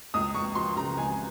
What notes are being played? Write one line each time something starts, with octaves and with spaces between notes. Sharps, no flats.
C#2 D#6
C#2 C#6
F3 C6
C#3 A#5
C#2 G#5